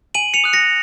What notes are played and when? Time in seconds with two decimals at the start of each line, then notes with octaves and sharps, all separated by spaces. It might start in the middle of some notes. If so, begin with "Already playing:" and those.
0.14 G#5 D#7 F#7
0.34 C#7 F7
0.44 D#6 F#6
0.53 A#6 C#7